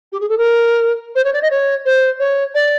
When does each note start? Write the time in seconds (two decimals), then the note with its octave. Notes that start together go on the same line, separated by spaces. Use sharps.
0.12 G4
0.20 G#4
0.29 A4
0.37 A#4
1.15 C5
1.24 C#5
1.33 D5
1.42 D#5
1.50 C#5
1.85 C5
2.19 C#5
2.54 D5